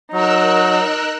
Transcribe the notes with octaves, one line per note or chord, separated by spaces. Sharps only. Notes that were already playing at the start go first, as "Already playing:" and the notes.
F#3 D#4 A#4 E6 F#6